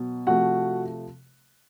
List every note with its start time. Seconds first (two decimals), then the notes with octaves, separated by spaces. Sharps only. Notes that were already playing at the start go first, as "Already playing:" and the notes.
Already playing: B2 F#3
0.27 C3 F3 A3 F#4 F#5